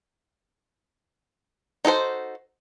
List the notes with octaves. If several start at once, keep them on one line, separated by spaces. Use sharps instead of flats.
D#4 F#4 A4 C5